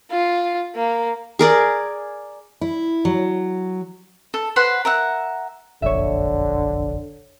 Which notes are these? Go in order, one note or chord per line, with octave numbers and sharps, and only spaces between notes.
F4
A#3
G#4 A#4 D5
E4
F#3
A4
B4 C5 F#5 C6
A#4 E5 F#5
F1 A#1 F#2 D3 C#5 E5